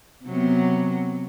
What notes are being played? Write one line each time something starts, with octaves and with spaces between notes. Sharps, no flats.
C3 F#3 B3